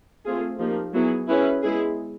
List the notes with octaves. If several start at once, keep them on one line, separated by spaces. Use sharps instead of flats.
A3 C4 F4 G#4
F3 A#3 D#4 G4
F#3 B3 E4 G#4
C#4 E4 G#4 B4
G#3 B3 E4 G#4